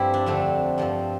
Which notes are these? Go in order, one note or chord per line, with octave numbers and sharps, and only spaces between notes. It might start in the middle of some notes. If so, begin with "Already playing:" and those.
Already playing: G2 F3 A3 C4 E4 G4
D4
F2 D3 A3 C4
G2 F3 C4